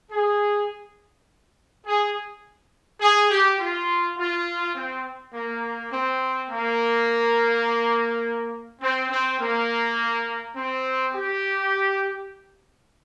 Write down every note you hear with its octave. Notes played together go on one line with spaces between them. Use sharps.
G#4
G#4
G#4
G4
F4
F4
C4
A#3
C4
A#3
C4
C4
A#3
C4
G4